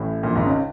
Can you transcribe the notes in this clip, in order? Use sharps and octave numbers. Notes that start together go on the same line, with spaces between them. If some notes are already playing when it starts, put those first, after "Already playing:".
Already playing: A1 A2
A#1 A#2
G#1 G#2
C#2 C#3